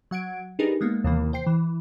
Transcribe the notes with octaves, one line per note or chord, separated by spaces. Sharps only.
F#3 F#5 G#6 D7
D4 D#4 G4 G#4 A#4 B4
G#3 A#3 B3
D#2 C3 E3 A#3
C5 G5 C7
E3